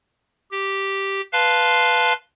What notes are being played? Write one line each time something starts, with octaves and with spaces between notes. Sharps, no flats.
G4
B4 F5 A5 C6